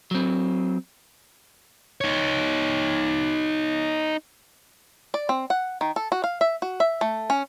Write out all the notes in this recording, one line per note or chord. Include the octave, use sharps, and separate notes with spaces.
F#3 C4
D#4 C#5
D5
C4
F#5
D#3
A4
F#4
F5
E5
F#4
E5
A3
C#4